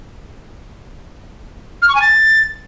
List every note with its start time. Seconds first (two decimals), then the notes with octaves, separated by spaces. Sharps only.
1.82 F6
1.88 C#6
1.95 G#5
2.02 A6